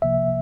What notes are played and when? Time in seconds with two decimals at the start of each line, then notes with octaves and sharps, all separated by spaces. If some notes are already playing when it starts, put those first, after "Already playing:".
0.02 C2 C3 F3 A#3 E5